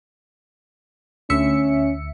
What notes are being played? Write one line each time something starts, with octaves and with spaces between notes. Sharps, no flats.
D2 C#4 E5 C#7